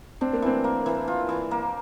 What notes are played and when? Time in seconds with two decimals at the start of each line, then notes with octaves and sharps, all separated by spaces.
0.21 C4 D4
0.33 A#3
0.42 E3 C4
0.64 A#3
0.86 E3
1.08 F4
1.29 E3
1.51 A#3